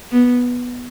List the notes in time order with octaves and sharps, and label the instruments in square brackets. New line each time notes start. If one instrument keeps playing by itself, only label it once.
[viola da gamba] B3